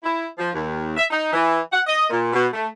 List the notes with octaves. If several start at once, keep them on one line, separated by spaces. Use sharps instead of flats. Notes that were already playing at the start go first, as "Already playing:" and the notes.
E4
F3
D#2
E5
D#4
E3
F#5
D#5
A#2
B2
A3